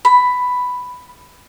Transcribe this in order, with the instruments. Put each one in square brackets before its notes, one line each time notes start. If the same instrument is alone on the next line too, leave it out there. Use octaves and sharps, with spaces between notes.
[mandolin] B5